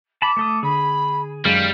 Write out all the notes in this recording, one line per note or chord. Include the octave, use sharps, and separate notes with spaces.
A5 B5 D6
A3 A4 D#6
D3 G#4 B5
F#2 D#3 G3 G#3 F5 F6